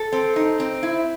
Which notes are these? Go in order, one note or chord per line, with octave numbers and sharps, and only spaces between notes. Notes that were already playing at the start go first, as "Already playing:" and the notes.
Already playing: A4
C4
D#4
C4
E4